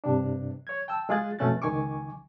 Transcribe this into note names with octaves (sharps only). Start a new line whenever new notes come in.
G2 C3 D4
C#5 G#6
G5 A5 E6
G#3 F4 G#4 F#6 A6
F2 B2 A3 C#4 F#6 A6
C#2 D#3 G#5 C#6 D6